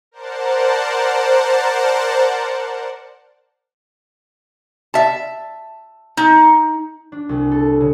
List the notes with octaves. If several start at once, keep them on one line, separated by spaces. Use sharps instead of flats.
A#4 C5 D5 F#5 A5
E5 A5
D#4
D4
C2
A4
C#3